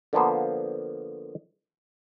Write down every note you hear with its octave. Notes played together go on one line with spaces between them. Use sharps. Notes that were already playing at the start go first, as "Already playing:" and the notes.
D3 F3 A#3 B3 C5